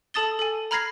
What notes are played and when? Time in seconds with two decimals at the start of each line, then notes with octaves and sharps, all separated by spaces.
0.14 A4 A5 D#6 A6 G7
0.39 A4 G#5
0.71 A#5 B5 F6 G#6 A#6 C7